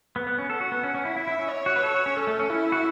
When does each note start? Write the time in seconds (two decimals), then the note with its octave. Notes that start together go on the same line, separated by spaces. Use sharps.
0.16 B3
0.27 B3
0.38 C#4
0.49 A4 F#5
0.61 F#4
0.72 B3
0.83 C#4
0.95 C#4
1.05 E4
1.16 E4 E5
1.28 E4
1.39 C#4
1.50 C#5
1.66 F#4
1.76 B4
1.83 A4
1.94 F#4
2.06 C#4
2.17 C#4 A4
2.27 A3
2.39 C#4
2.50 C#4 E4
2.72 F#4